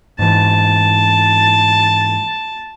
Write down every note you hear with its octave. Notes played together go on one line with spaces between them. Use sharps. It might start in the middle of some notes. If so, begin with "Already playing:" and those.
G#2 E3 A5